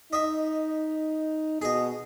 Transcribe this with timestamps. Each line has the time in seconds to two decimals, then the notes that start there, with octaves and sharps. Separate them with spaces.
0.13 D#4 D#5 E5
1.62 B2 G#4 D#5